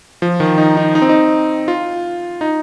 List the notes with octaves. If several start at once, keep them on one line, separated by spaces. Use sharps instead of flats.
F3
D#3
D#4
D#4
D#4
C4
D#4
F4
D#4